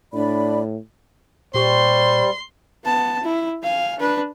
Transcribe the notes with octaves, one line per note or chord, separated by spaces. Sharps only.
A2 D4 D5 B5
A#2 G3 G4 C5 C6 C#6
B3 A5
E4
F5 G#5
D4 B4